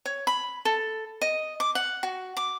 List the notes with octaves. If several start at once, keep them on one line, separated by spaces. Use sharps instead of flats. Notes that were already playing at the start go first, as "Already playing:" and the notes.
C#5
B5
A4
D#5
D6
F#5
F#4
D6